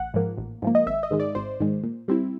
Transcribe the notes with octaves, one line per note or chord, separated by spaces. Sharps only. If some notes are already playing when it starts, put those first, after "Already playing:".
Already playing: A1 F#5
G#2 F3 A#3
A1
G#2 F3 A#3
D#5
G#1 E5
D#5
G#2 D#3 G#3
D5
G#1 C5
G#2 D#3 G#3
A#2
G3 C4 E4